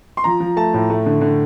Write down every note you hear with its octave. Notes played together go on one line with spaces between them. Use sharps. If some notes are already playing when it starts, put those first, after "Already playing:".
C6
F3 A#5
F3
A3 A5
A2
A3
D3
D3